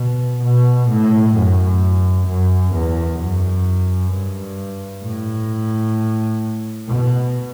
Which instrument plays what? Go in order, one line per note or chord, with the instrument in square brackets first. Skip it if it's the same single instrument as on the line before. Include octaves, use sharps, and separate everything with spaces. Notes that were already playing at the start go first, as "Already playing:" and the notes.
Already playing: [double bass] B2
B2
A2
F#2
F#2
E2
F#2
G2
A2
B2